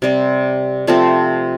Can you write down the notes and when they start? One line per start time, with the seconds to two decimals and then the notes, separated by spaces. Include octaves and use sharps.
0.02 C3 G3 C4
0.87 C3 F3 A3 C4